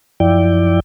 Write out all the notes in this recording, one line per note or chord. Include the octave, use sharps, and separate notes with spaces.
F#2 F3 E4 D5 G5